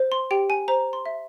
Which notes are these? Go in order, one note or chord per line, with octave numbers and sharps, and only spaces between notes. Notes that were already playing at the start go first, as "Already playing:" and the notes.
Already playing: C5
C6
G4 G5
G#5
C5 A#5
C6
E5